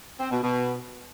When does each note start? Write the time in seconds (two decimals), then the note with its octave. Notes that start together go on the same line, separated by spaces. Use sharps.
0.20 C4
0.31 B2
0.43 B2